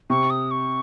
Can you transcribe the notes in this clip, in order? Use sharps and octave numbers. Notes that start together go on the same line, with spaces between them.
C3 C#6
D#6
C#6